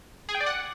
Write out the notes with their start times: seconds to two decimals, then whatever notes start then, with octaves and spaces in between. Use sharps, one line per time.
0.29 G#4
0.35 G5
0.40 D5
0.46 F#5